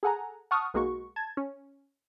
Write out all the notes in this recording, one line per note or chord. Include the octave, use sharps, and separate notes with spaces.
G#4 A4 F#5 G#5 A#5
F#5 A5 C#6 D#6 F6
B1 G#3 A#3 F#4 C#6
A5 G#6
C#4